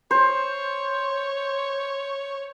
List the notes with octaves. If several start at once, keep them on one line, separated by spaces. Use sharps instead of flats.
C5 C#5